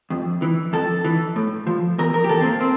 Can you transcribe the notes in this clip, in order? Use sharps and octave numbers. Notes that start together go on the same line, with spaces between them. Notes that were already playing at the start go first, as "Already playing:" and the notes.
F2
E3
F2 A4
E3
A2
F3
E2 A#4
A#4
G4
E3 A4
C4
A#3
C4